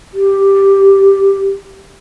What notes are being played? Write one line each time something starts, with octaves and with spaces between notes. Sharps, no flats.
G4